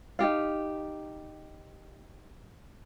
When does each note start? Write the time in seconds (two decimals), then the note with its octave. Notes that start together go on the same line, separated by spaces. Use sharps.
0.19 D#4 F4 G4 F5